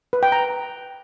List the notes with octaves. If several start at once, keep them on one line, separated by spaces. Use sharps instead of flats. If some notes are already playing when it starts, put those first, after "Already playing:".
B4
G5
A#5